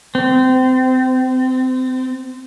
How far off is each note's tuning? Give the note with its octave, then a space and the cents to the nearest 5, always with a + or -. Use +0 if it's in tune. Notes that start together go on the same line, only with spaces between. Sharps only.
C4 -25